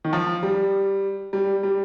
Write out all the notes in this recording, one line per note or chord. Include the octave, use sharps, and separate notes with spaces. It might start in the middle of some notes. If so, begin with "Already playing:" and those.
D#3
F3
G3
G3
G3